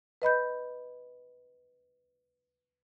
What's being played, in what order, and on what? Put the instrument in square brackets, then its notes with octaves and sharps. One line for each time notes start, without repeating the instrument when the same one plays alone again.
[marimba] B4 D#5 B5 G6